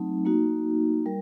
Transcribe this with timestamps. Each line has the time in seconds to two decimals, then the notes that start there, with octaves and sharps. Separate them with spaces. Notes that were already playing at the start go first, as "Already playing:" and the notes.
Already playing: F#3 A3 C4 D#4
0.25 A#3 D#4 F#4
1.06 G3 A#4